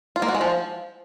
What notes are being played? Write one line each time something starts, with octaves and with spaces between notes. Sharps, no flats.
F4
A#3
F#4
G#3
F3